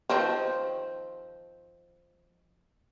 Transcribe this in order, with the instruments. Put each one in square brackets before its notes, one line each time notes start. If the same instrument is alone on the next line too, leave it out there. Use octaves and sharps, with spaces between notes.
[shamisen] D#3 F3 C4